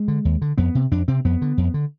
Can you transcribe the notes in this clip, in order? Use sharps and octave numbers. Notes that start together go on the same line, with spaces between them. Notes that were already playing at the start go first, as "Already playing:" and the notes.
Already playing: G#3
D3
D#2
D3
F2 B3
C3
F2 D4
C3 C4
F2 B3
D3
F2
D3